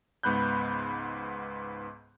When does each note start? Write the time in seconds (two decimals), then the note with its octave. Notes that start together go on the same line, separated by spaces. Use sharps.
0.23 C#2 G#2 B3 B5 F#6 G6